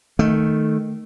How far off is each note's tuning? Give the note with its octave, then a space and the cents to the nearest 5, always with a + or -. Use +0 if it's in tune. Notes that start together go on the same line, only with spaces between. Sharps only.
D#3 +0 A3 +0